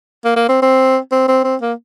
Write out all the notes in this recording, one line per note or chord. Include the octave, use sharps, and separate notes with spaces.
A#3
A#3
C4
C4
C4
C4
C4
A#3